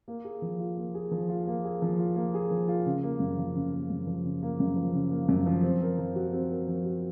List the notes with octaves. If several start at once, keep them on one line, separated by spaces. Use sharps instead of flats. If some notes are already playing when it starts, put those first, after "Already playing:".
A#3
G#4
F3
F4
A#3
G#4
F3
F4
A#3
G#4
F3
F4
A#3
G#4
F3
F4
C#3
A#3
F#2
F3
C#3
A#3
F#2
F3
C#3
A#3
F#2
F3
C#3
A#3
F#2
F3
C4
A#4
F3
F#4
C4
A#4
F3
F#4